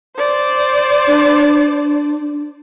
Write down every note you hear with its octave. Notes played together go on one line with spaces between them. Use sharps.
C5 D5
D4